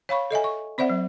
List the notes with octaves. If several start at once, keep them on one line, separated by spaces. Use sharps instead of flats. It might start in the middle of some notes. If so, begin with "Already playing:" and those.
C#5 F5 B5 C#6
A4 D#5 E5 G#5
C#6
C4 C5 D5 E5 F#5
F#3